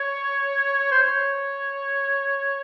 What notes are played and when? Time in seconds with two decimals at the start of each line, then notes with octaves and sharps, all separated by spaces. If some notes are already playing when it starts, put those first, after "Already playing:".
Already playing: C#5
0.92 C5
1.02 C#5